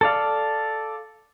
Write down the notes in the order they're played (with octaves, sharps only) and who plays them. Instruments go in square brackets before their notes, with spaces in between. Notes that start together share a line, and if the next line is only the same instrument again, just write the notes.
[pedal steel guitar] A4 D5 F5